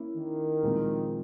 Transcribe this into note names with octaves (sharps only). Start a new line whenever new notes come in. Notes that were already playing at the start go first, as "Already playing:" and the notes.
Already playing: A#3 C#4 E4
D#3
A#2 F3 G#3 C4